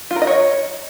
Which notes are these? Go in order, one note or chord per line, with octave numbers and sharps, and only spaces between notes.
F4
A#4
D#5
C#5